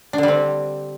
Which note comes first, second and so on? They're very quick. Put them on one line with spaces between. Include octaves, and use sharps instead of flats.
D4 D3 G3 C4